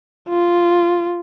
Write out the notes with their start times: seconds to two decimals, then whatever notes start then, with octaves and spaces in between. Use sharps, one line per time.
0.29 F4